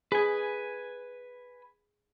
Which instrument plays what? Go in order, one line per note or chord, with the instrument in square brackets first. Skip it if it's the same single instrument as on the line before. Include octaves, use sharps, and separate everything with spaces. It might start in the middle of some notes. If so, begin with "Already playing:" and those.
[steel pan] G#4 [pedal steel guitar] B4 G#5